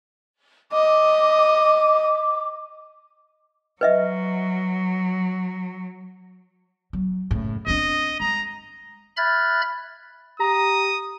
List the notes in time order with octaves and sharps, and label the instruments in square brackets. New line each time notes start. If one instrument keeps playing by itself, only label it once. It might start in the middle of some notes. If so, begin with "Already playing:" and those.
[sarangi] D#5 [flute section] D6
[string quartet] F#3 [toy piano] B4 D#5 E5
[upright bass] F#3
F#1 A2
[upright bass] C4 D4 [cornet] D#5
[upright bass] G#3 [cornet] A#5
[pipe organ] E5 B5 F6 F#6 G#6 A6
[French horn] G4 [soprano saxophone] A#5 [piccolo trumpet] D#6